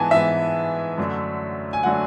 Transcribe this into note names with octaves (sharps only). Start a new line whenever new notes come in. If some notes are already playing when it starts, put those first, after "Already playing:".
Already playing: G#2 E3 B3 G#5 A5
G#2 E3 B3 E5
F#2 D3 F#3 A3 D4
G#5
D3 F#3 A3 D4 F#5